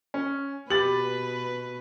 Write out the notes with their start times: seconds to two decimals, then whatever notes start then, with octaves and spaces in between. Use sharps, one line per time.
0.14 C#4
0.70 B2 G4 B4 A6 F#7